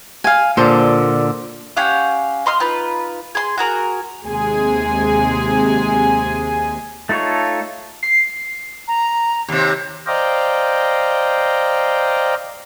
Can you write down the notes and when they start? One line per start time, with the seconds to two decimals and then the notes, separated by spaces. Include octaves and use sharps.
0.24 F5 G#5
0.57 A#2 D3 C5 A5
1.77 C#4 G4 F5 F#5
2.46 D#5 C6 D#6 F6
2.60 D#4 F4 B4
3.35 G#4 C6
3.58 F#4 G#4 A#4
4.23 D#2 C3 G#3 G#4 G#5
7.09 A3 D#4 F4 A4 C#5
8.03 C7
8.88 A#5
9.48 D#2 C3
10.07 C5 D5 D#5 F5 G5 A#5